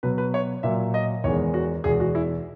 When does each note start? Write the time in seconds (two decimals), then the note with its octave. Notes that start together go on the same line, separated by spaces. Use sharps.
0.03 B2 F#3 B4
0.18 B4
0.34 C#5
0.63 A#2 F#3 E5
0.94 D#5
1.24 E2 D#3 G#3 C#5
1.54 F#4
1.84 E2 B2 G#3 G#4
2.00 F#4
2.15 E4